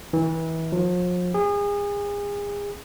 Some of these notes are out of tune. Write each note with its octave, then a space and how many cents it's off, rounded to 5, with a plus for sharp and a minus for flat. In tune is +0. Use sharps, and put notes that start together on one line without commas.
E3 -25
F3 +40
G#4 -30